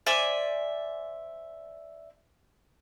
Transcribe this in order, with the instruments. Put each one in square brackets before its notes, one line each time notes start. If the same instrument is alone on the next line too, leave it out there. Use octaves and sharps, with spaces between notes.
[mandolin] C5 D5 E5 G#5